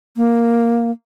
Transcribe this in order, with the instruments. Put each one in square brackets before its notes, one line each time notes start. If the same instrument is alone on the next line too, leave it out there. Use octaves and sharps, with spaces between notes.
[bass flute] A#3